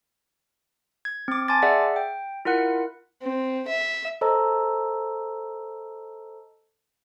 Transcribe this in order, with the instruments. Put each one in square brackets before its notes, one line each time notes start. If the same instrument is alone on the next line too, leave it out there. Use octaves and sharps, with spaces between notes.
[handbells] G#6
C4 D6
G#5 A5 C6 D6 A6
G#4 D5 E5 F#5
G5
E4 F4 A#4 F#5 F#6 C#7
[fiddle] C4
E5
[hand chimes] A4 C5 D#5 A5 A#5 E6